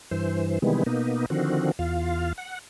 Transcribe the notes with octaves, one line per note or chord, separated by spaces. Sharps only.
G2 E3 C5
C3 D#3 E3 G3 G#3 B3
B2 A#3 B3 D#4
D3 D#3 F3 C4 F#4
E2 F4 F5
F#5